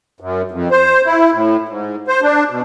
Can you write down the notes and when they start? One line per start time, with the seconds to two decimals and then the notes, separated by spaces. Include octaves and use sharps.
0.20 F#2
0.51 F2
0.71 C5
1.06 E4
1.33 A2
1.69 G#2
2.08 C5
2.22 D4
2.50 B2